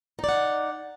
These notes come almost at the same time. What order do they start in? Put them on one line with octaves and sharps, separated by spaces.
D#4 D5 F#5